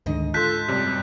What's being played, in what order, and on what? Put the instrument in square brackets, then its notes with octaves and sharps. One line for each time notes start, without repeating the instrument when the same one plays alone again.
[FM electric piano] D2 D3 D#3 [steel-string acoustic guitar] G#2 D#5
[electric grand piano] F4 A4 [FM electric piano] A5 C6 [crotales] F#6 G6 B6
[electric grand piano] F#2 C3 G3